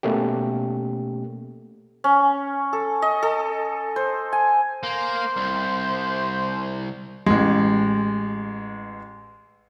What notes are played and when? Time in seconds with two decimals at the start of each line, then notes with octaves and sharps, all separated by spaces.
0.03 B2 A3 A#3 C#4 G4
2.04 C#4
2.73 A4
3.02 D#5
3.23 A4
3.96 C5
4.32 G#5
4.83 A#3 C5
5.36 C2
7.26 A1 G#3